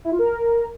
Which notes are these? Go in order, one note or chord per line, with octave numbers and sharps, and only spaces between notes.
E4
F4
A#4